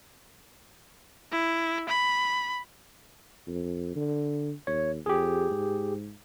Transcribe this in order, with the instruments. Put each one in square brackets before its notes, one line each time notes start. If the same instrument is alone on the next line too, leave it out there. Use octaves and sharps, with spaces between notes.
[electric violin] E4
B5
[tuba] F2
D3
[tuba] D#2 [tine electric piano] C#5
[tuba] F2 [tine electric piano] G4 G#4
[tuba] G#2